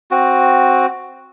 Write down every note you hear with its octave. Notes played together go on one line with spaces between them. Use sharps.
C4 F#4